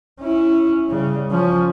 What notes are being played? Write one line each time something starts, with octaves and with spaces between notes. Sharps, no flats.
C#4 E4
C#3 G3
F3 C#4